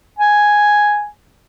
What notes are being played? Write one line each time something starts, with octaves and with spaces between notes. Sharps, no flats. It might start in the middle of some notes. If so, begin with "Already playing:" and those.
G#5